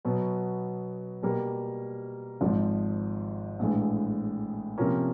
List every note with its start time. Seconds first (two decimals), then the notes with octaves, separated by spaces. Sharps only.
0.05 B2 F#3 B3
1.23 B2 G3 A#3
2.41 G#1 G#2 F3
3.59 A#1 A2 E3 G#3
4.78 C3 F3 A#3 C#4